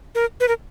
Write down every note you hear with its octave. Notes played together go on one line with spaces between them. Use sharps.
A#4
B4
A#4